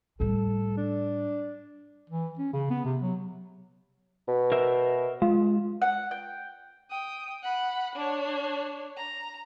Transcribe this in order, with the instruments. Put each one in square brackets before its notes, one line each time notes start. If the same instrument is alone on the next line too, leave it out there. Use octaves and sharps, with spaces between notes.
[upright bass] A2 G3 [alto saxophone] A4
[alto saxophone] D4
[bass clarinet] E3
C#4
C#3
B3
C3
F#3
[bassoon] B2
[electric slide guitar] A#4 C5 E5
[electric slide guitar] G#3 [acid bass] F4
[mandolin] F#5
G5
[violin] G5 D#6
F#5 B5
D4 C#5
A#5